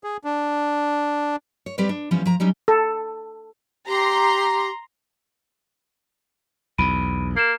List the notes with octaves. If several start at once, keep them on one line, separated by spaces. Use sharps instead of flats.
G#4
D4
C#5
G3 C4 G4 B4 D5
D4
E3 F3 G3 B3 C#4
F3 A#5
F#3 G3 C#4 D#4
A4
G4 A#5 C6
B1 E2 B5 D7 D#7
A#3 C7 E7